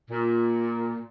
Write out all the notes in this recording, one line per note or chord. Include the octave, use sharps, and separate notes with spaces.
A#2